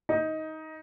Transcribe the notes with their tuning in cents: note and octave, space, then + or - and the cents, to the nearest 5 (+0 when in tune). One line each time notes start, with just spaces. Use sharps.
D#4 +15